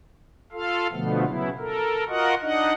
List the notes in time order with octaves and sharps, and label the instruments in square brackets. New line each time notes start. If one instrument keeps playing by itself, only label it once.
[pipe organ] F4 A4 F5
B2 D3 F3 A3 B3
C#3 F#3 B3 E4
A4 A#4
F4 F#4 A#4 D#5 F#5
D4 D#4 D#5 F#5